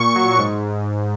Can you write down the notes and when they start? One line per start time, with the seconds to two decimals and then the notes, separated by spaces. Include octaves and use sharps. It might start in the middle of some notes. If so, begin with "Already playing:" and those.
Already playing: A#2 C#6
0.16 F#3
0.39 G#2